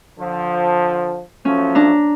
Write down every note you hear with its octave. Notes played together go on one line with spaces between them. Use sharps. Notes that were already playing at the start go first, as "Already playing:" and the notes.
D3 F3
F3 F#3 A3 C#4
D4 A#5